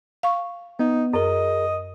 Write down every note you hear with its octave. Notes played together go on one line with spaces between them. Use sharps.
F5 C#6
B3 D#4
F#2 G#4 A#4 D#5